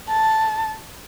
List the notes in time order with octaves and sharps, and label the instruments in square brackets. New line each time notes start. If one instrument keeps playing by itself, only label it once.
[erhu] A5